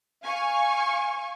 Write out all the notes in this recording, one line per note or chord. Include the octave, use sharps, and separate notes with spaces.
F5 G#5 C#6